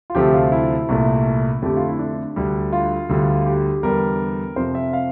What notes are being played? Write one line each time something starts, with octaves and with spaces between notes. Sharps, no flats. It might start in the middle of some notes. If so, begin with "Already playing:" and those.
F4
D2 C3 F3 A3 G4
F4
E4
C2 A#2 A3
F2 D3 A3 G4
F4
E4
D4
D2 D3 G3
F4
D2 D3 G3
G4
E2 D3 G3 A#4
F2 C3 F3 C5
E5
F5